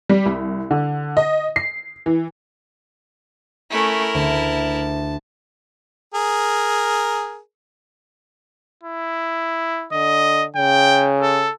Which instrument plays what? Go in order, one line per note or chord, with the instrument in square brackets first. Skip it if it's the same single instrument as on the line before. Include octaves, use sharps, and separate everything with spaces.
[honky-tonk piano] G3
C2
D3
D#5
C7
E3
[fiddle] A3 C#4 [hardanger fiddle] E4 A#4
[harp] D2 [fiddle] A5
[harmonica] G#4 A#4
[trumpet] E4
[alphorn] D3 [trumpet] D#5
[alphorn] C#3 [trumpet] G5
[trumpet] A4